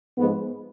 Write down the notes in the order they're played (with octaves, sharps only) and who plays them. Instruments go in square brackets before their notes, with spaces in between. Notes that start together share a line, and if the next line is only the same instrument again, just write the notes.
[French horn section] G#2 F3 G#3 B3